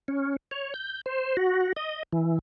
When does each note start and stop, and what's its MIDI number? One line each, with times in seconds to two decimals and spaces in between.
0.08 0.36 61
0.51 0.74 73
0.74 1.01 91
1.06 1.37 72
1.37 1.73 66
1.76 2.03 75
2.12 2.39 52